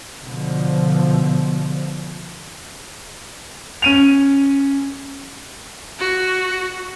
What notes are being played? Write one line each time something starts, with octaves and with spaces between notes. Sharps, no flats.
B2 D3 F3
C#4 D#7 F7
F#4